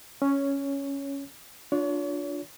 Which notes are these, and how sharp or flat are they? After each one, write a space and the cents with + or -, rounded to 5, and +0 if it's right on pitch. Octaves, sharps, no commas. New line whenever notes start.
C#4 +0 C#5 +10
D4 +0 F4 +30 C#5 +40